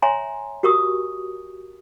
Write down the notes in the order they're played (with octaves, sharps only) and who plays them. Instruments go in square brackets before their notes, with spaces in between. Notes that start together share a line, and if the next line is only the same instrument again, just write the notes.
[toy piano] C#5 E5 G#5 A#5 C6
F#4 G4 A#4 C#6 D#6